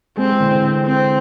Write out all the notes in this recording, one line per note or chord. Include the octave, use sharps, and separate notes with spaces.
G#3 C4
E3
D3
C4